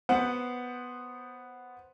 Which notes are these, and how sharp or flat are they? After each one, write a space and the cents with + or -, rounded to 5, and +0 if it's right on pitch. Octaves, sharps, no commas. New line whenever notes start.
B3 +0 C5 +0 F#5 +0